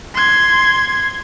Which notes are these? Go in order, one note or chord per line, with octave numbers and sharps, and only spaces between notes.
C6 G#6